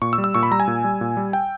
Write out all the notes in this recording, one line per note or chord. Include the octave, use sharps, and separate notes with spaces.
A#2 C#6
E6
G3
E6
A#2 C#6
B5
G3 A#5
G#5
A#2
G3
A#2
G3
G5